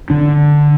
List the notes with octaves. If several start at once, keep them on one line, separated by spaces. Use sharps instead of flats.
D3 D4